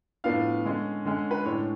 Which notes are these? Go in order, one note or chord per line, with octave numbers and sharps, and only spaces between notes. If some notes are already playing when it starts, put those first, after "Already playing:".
A2 F3 B3 D4 F5
D3 G#3 C#4
D3 G#3 C#4
B4
A2 G#3 D4 C#5